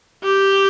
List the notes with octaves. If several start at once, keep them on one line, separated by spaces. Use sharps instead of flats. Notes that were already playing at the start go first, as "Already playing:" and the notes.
G4